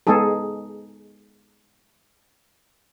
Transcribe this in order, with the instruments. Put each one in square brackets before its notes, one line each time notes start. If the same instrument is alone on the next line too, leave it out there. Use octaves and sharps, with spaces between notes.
[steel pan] G#3 B3 D#4 G#4 A4